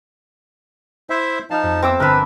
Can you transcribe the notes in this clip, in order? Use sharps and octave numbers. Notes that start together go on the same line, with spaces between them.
E4 C5 E5
F3 D#4 F5 A5 F6
F2
B3 C4 E5 D6 E6
G1 A#4 B4 A5 B5